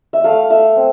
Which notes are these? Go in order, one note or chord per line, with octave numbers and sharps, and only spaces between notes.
E5
A3 F5
A3 E5
C4